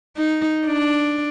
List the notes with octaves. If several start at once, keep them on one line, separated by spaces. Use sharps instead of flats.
D#4
D4